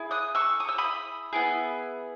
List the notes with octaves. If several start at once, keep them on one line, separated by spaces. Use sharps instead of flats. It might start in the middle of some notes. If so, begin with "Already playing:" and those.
Already playing: E4 G#4
D#6 F#6
C#6 E6
D#6
E6
B5 D#6
B3 E4 G#4